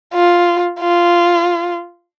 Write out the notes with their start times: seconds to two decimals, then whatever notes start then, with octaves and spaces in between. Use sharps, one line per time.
0.13 F4
0.80 F4